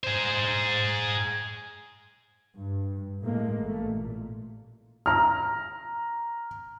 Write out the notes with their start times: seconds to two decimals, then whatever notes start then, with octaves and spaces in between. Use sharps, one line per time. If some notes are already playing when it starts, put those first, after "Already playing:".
0.04 G#4 C5
2.58 G2
3.22 A2 G#3 A#3
3.57 A1 A3
3.93 A#2
5.06 A#5 F6